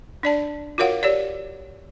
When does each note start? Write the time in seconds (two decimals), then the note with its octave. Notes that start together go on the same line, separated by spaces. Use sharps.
0.23 D4 D5 A5
0.78 F4 F#4 A#4 C#5 F5 F#5
1.03 G4 C#5 D5